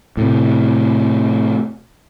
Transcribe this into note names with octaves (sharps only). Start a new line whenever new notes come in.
A2 C3